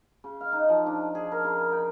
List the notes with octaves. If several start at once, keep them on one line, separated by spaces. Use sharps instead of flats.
C#3
F5
D#4
F3
D4
G#4
A#4
C#3
G5